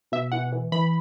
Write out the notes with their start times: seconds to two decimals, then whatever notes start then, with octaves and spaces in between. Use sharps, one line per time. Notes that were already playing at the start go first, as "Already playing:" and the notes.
0.12 B2 E5
0.32 E3 F#5
0.52 E3
0.72 E3 B5